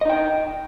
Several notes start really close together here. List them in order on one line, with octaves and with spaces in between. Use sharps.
D#5 D#4 G5